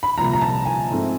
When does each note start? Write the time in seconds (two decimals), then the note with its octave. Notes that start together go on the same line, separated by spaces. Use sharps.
0.03 B5
0.17 C2 A#2 F3 A#5
0.33 A#5
0.41 A5
0.66 G#5
0.90 G#2 F3 A3 C4 E4